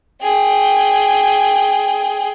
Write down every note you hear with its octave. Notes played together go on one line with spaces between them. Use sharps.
G#4 G5